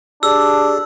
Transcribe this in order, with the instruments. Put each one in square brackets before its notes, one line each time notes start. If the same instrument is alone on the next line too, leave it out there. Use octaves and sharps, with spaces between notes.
[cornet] D4 [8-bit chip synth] G4 G#4 D5 [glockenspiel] E6